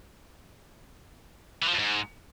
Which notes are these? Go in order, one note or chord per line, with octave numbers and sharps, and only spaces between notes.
E3
F3
F2
G#2